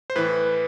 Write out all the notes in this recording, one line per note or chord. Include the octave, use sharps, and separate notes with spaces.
C5
A2 E3 B4